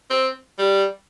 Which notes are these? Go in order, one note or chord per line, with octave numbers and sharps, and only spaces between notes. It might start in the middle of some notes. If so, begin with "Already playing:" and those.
C4
G3